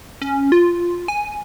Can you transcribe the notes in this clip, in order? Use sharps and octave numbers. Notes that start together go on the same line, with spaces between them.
C#4
F4
G#5